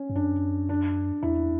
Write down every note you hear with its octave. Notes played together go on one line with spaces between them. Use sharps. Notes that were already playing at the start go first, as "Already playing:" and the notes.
Already playing: C#4
G2
F#2 D4
D4
E2 E4